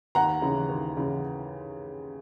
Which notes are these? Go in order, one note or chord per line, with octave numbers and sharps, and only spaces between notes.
D#2 F#5 A#5
C#3 E3
D#2
C#3 E3